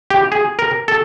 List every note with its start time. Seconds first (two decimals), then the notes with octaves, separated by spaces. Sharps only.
0.10 G4
0.32 G#4
0.59 A#4
0.88 A4